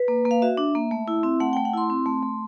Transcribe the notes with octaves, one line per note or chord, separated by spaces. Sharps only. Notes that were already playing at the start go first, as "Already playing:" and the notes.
Already playing: B4
A#3
A#3
F5
F#4 E5
D4
A#3
A3
E4
C4
A3 F#5
A3 G5
F#5
E4 C6
C4
A3
A3